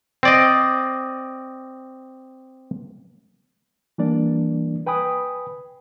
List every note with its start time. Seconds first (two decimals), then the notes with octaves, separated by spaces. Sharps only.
0.23 C4 D5 D#5
3.98 E3 G3 A#3 D4 D5
4.86 B4 G5 G#5 B5 D#6